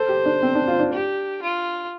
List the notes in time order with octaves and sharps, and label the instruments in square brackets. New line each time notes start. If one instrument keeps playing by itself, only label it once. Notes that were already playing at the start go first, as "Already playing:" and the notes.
Already playing: [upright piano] A4 [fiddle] C5
[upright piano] G4
D4
C4
D4
F4
D4
[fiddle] G4
F4